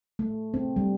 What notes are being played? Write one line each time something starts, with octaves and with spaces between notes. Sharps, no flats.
A3
C4
G3